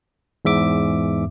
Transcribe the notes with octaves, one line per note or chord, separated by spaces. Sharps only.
E2 G#2 E5 D6